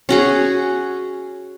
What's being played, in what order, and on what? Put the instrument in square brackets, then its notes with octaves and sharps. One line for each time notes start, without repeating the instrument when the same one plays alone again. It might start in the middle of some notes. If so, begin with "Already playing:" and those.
[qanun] C#4 F#4 G#4